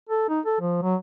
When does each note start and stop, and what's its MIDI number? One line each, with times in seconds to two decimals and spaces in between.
0.09 0.28 69
0.29 0.40 63
0.45 0.56 69
0.61 0.82 53
0.82 0.95 54